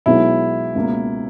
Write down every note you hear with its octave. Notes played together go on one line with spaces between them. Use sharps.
B1 B2 G#3 B3 E4
C#2 B2 A#3